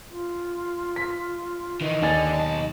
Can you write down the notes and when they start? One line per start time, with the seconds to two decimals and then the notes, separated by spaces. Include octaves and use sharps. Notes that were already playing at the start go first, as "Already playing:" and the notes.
0.10 F4
0.96 B6
1.81 D#3 E3 D#5
2.02 D#2 D3 D4 G#5 A6
2.35 B1 A5